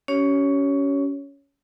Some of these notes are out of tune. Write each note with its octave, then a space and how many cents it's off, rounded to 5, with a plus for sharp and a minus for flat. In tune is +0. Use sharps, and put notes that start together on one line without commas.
C#4 +20 G4 -35 C#5 +5